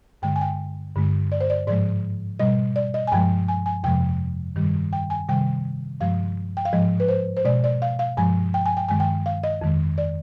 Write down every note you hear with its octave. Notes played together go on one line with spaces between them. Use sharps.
G2 D3 G#3 G5
G#5
G5
G2 D3 G#3
D5
C5
D5
G#2 F3 G#3 D5
B2 G3 D#5
D5
D#5
G#5
G2 F3 G#3 G5
G#5
G#5
F2 C3 F3 G#3 G5
G2 D#3 G3
G5
G#5
C3 D#3 G3 G5
G2 F3 G#3 F5
G5
F5
G#2 F3 G#3 D#5
B4
C5
C5
B2 G#3 D5
D5
F5
F5
G2 F3 G#3 G#5
G5
G#5
G5
G2 D#3 G#3 G#5
G5
F5
D#5
F2 D#3 G#3
D5